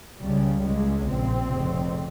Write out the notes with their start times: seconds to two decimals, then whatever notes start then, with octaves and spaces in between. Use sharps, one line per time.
0.20 C#2 C#3 G3
0.63 C#2 C#3 G#3
1.06 A#1 A#2 C4
1.50 F1 F2 C#3